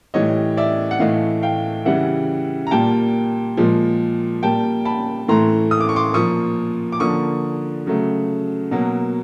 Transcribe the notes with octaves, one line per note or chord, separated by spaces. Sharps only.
A2 E3 G3 C#5 D#5
D5 E5
F#5
A2 E3 A3 D#5 F5
F5 G5
C#3 E3 G3 E5 F#5
A#5
A#2 G3 A#3 G5 A5
A#2 F3 G#3
A#2 G3 A#3 G5 A5
A5 B5
A2 E3 A3 A#5 C6
D#6
D6
C#6
C6 D6
A#2 F3 A#3 C#6 D#6
D6
D3 F3 A#3 C#6 D#6
C#3 F#3 A3
B2 F#3 A#3